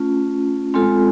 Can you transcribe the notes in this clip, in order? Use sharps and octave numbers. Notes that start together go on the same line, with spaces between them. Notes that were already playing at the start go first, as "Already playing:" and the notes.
Already playing: A3 C#4 F4
G#3 C4 F4 A4